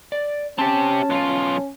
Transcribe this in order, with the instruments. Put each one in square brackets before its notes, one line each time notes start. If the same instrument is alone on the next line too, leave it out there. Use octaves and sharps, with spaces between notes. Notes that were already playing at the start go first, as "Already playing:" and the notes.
[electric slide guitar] D5
[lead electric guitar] C4 G4 [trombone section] C#4 [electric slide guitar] A5
[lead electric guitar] B1 F4